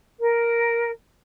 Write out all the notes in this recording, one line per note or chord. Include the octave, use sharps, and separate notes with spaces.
A#4